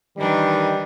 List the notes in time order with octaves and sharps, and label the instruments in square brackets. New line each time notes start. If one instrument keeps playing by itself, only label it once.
[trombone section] D#3 [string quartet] E3 D4 D#4 [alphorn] G3